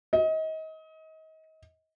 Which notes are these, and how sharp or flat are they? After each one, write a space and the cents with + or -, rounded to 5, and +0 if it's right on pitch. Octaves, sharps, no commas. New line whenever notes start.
D#5 +30